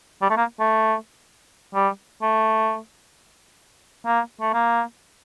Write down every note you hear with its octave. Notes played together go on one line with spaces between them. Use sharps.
G3
A3
A#3
A3
G3
A3
A#3
A3
A#3